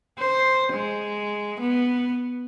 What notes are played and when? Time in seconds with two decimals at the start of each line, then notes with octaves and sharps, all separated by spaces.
0.19 C5
0.74 G#3
1.60 B3